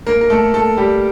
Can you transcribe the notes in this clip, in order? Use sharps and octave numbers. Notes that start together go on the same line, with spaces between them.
A#3 A#4
A#4
A3 A4
A3 A4
G3 G4